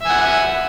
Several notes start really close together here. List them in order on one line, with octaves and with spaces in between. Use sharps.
E5 G#5 F#5